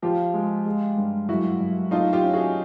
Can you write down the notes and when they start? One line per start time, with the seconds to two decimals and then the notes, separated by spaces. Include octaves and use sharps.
0.02 F3 F4 G4
0.34 G#3
0.66 G#3
0.97 G2
1.28 F#2 E4 F#4
1.60 F#2
1.91 A3 D#4 F4
2.13 F4 G4
2.24 C#4
2.33 F#4 G#4